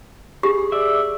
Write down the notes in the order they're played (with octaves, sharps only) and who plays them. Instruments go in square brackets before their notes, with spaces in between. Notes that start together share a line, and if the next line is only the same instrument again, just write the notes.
[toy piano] G4 [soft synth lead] G#4
[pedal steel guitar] D5 E5